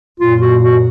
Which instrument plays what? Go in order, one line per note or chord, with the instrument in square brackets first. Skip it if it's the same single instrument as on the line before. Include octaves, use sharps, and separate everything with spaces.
[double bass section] F#2 A#2 [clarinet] F4
[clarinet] F#4
F#4